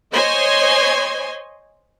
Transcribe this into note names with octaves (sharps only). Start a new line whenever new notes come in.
C5 C#5 D#5 G#5 C6